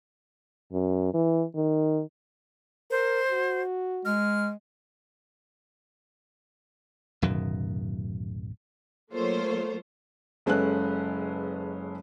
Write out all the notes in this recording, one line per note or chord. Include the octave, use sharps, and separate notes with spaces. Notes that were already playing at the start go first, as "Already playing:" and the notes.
F#2
E3
D#3
A#4 C5
F#4
G#3 F6
D1 F#2 B2 D#3
F#3 A3 A#3 F4 C5 C#5
F#1 G#3 C#4 A4 B4 F#6